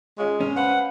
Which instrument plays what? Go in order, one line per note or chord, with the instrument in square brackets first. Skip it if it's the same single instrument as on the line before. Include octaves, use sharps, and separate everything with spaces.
[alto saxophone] G#3 [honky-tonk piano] C#4 F4 C#5
[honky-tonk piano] G2 [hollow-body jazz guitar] C#4
[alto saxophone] B4 [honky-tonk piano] C5 F5 B5 [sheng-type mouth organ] F#5